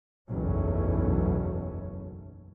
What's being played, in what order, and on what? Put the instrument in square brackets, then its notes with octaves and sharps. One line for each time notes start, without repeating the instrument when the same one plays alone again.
[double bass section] F#1 B1 E2 A3 C#4